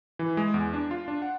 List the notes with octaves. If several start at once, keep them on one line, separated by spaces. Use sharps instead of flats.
E3
G#3
E2
D4
F4
D4
F#5